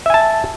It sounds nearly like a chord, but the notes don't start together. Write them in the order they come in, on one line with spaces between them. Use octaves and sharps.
E5 G#5 A5